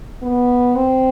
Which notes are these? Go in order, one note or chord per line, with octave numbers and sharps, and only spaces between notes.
B3
C4